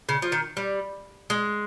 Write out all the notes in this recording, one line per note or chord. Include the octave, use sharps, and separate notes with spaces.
C#3
F3
D#3
G3
G#3